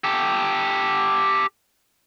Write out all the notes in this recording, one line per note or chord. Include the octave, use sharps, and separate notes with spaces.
G4 A4